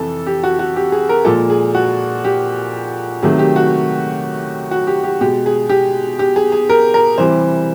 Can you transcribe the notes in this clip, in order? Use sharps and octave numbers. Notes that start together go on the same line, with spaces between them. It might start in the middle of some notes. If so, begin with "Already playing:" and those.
Already playing: F2 C3 E3 A4
G4
F#4
F#4
G4
G#4
A#4
A#2 F3 G#3 A4
G#4
F#4
G4
C3 D#3 F#3 A3 G#4
G4
F#4
F#4
G4
G4
B2 G#3 G4
G#4
G4
G4
G#4
G#4
A#4
A#4
C3 E3 G3 C5